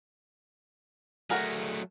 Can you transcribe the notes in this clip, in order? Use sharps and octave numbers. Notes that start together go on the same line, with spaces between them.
F#3 A3 G#4 A#4 F#5